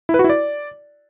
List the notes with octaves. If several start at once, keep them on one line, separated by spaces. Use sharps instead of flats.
E4
B4
F#4
E4
D5